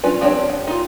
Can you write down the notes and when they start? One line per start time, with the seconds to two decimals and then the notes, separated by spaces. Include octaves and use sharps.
0.03 F#3 C#4 D4 F4 B4
0.21 F3 C4 D4 G4 C#5
0.50 F#5
0.67 D#4 F4